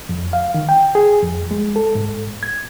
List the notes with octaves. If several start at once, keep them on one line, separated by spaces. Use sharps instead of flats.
F2
F5
D#3
G5
G#4
F2
G#3
A4
G#2
G#6